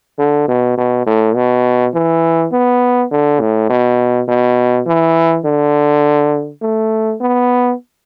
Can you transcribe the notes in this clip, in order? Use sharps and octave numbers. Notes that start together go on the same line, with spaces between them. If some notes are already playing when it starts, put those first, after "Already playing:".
D3
B2
B2
A2
B2
E3
B3
D3
A2
B2
B2
E3
D3
A3
B3